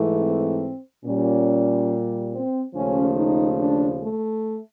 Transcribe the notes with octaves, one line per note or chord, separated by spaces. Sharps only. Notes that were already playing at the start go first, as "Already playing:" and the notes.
Already playing: G#2 E3 A3
C4
A#2 G3 C#4
C4
D#2 C#3 F3 A3 C#4
D#4
D4
A3